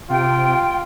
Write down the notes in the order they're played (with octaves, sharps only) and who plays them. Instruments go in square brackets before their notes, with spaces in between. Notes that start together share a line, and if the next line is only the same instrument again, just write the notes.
[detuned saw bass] C3 [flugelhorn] F4 [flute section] G5